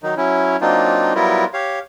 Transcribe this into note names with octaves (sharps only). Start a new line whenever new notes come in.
D#3 F#3 D#4
F#3 C#4 E4
F#3 A#3 C4 D4 D#4 F4
F#3 G3 B3 E4 F4 A#4
G4 C#5 F5